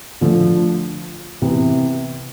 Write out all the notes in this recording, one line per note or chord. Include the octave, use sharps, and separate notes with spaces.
D3 F3 A3
C3 E3 B3